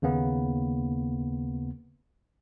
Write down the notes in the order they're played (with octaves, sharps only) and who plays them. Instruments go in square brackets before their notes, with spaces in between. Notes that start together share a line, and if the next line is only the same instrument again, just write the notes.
[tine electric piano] D#2 C#3 A#3 B3